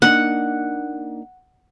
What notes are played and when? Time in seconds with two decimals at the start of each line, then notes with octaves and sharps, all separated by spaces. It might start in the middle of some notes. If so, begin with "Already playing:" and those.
0.02 A#3 D4 D#4 F#5